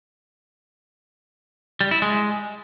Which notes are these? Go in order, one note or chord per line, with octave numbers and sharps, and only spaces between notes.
G3
E4
G#3